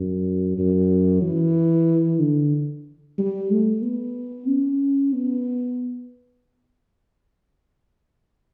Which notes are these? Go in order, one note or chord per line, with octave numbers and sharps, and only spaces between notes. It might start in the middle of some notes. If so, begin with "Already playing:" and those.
Already playing: F#2
F#2
E3
D3
G3
A3
B3
C#4
B3